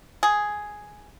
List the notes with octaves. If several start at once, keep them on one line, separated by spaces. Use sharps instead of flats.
G#4